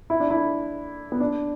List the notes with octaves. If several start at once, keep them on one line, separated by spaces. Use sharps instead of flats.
E4
D4
E4
B3
D4